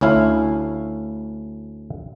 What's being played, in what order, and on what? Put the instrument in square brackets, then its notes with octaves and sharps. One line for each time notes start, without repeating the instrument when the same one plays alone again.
[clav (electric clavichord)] D2 C#4 E4 F5